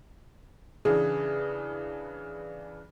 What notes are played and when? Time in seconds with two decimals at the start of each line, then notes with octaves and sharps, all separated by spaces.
0.85 C#3 E3 D4 G#4